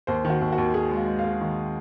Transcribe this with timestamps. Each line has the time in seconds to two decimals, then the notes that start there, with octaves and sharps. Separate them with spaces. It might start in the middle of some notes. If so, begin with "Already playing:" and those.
0.07 D#2 C5
0.25 D#3
0.30 F#4
0.41 D#2
0.53 F#4
0.58 D#2
0.74 D#2 G#4
0.91 G#3
0.97 F5
1.07 G#3
1.19 F5
1.24 G#3
1.41 D#3